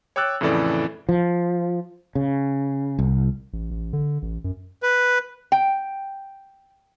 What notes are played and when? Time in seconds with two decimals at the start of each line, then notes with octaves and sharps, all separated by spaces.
0.16 C#5 G5 D6 E6 F#6 A6
0.41 F2 A2 C#3 E3 A4 D5
1.09 F3
2.15 C#3
2.99 C2
3.53 A1
3.71 A1
3.93 D3
4.22 A1
4.44 F#2
4.83 B4
5.52 G5